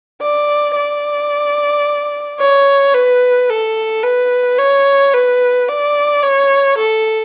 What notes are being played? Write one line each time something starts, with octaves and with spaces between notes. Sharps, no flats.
D5
D5
C#5
B4
A4
B4
C#5
B4
D5
C#5
A4